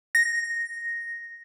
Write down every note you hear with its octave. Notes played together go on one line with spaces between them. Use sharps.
A#6